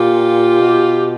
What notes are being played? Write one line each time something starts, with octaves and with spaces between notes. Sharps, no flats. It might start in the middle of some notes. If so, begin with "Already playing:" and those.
Already playing: A#2 F4 G4
B2